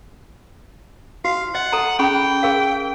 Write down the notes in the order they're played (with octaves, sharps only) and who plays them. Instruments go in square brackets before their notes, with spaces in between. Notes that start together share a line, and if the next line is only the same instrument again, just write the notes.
[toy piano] F#4 [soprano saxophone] F5
[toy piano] D#5 [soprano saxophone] F#5
[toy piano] A4 A5 A#5
[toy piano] C#4 G#4 B5 [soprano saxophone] G5
[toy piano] G#4 A#4 F5